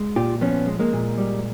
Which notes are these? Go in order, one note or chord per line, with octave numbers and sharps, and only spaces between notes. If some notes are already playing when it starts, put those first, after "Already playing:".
Already playing: G#3
A#2 F4 G4
F3 B3 C#4
G#3
G#3 A#3
A#2
G3